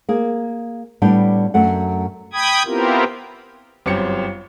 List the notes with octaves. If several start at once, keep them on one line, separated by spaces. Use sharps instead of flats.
A#3 G#4
A2 G3 B3 D4 D5 G5
F#2 A3 F#5
G5 B5 D#6 G#6
B3 C4 E4 F4 G4 A#4
G1 F#2 C4 C#4 G4 C#7